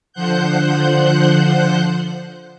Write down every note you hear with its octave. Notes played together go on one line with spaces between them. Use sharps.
D3 F3 C5 F#5 F#6 G6